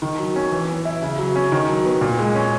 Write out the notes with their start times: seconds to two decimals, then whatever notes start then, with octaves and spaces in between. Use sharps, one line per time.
0.02 D#3
0.19 F#3
0.36 C#4
0.52 E3
0.69 B3
0.85 E4
1.02 C#3
1.18 F#3
1.36 C#4
1.52 D#3
1.69 F#3
1.85 B3
2.01 A#2
2.19 G#3
2.35 C#4